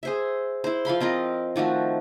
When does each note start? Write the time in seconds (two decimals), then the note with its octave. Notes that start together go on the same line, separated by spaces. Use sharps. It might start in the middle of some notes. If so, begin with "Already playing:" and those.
0.03 G#4 C5 E5
0.64 E4 C5
0.85 F3 F5 B5 C6
1.00 C4 F4 A#4 D#5
1.56 D#3 F3 A3 F#4